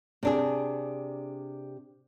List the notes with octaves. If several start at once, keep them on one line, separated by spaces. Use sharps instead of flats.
C3 D4 G#4